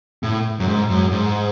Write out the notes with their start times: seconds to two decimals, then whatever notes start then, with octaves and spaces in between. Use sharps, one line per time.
0.23 A2
0.60 F#2
0.68 G#2
0.90 F#2
1.11 G#2